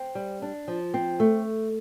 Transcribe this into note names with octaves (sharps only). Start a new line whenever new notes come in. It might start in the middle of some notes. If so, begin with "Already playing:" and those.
Already playing: C4
G3
D4
F3
C4
A3